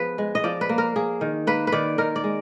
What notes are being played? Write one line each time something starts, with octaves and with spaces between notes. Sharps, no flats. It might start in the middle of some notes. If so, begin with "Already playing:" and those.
Already playing: F3 B3 G#4 B4
G#3
D#5
F3 D5
B4
A#3
A#4
A#3 G#4
D#3
A#3 B4
B4
D#3 D5
D#3 A#4
D5
G#3